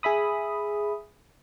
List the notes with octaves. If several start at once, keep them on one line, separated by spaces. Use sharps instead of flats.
G#4 E5 B5 D#6